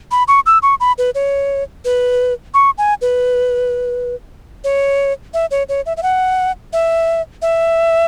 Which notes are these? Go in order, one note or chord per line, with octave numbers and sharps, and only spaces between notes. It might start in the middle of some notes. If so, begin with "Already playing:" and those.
B5
C#6
E6
C#6
B5
B4
C#5
B4
C#6
G#5
B4
C#5
E5
C#5
C#5
E5
E5
F#5
E5
E5